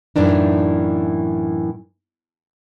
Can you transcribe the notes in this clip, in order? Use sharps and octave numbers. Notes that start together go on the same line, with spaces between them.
F#2 A2 E3 D4 D#4